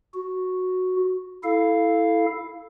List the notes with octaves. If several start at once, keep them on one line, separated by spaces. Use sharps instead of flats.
F#4
E4 A4 F5